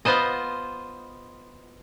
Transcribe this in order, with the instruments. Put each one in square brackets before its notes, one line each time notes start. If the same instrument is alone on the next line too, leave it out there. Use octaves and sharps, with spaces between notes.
[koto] B3 F4 C5 D#5